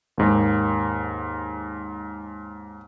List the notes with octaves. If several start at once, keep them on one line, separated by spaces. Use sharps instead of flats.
D#2 G#2